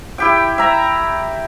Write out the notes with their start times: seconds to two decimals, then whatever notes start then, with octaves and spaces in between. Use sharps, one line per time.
0.18 E4 G4 G5
0.58 E5 A#5